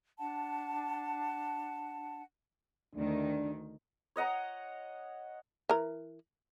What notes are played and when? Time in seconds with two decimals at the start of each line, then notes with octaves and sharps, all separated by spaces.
0.18 D4 F#5 A5
2.95 D2 D#3 D4
4.16 C#5 D#5 F#5 A#5
5.69 E3 A#4